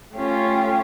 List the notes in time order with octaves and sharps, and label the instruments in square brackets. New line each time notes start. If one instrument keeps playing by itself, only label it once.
[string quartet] A3 C#4 F4 G4